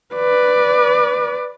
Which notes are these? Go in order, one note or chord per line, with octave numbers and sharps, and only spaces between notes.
B4 D5